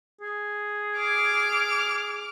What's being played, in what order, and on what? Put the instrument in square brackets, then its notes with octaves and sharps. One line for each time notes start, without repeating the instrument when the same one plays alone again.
[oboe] G#4
[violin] D6 F6